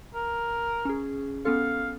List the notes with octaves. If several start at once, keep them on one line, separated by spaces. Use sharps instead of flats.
A#4
C#4 G#4
B3 C#4 A4 F5